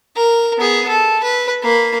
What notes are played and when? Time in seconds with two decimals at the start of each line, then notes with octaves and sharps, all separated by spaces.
0.16 A#4
0.57 B3 G#4
0.89 A4
1.24 B4
1.63 A#3 B5